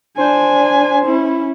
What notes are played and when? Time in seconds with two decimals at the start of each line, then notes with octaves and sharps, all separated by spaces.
0.18 D4 C5 G#5
1.05 C#4 E4